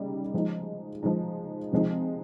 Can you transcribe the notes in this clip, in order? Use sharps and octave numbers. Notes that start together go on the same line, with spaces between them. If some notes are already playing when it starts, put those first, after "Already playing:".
Already playing: C#3 G3 D#4
F3 G#3 D#4
F3 G#3 D#4
C3 F3 G#3 D#4